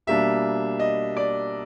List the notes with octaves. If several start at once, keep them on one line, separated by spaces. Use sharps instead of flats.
B2 G3 A#3 D4 E5
D#5
D5